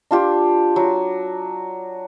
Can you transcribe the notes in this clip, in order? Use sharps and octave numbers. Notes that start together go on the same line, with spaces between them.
D4 F4 G4
F#3